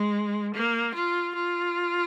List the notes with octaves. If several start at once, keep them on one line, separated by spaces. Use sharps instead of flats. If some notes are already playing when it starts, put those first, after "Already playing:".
Already playing: G#3
A#3
F4
F4